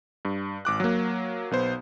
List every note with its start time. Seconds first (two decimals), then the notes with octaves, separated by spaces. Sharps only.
0.25 G2
0.65 G#1 D6 F#6
0.80 F#3 A#3
1.51 B1 B3 C5